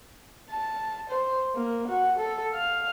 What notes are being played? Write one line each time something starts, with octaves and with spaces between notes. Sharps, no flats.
A5
C5
A#3
F#4
A4
F5